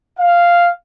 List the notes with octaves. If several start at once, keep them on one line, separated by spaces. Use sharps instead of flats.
F5